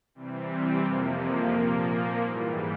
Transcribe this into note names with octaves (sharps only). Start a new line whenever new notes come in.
C3 E3 G3 C4
F2 C3 F3 A#3
A#2 F3 A#3
G#2 E3 G3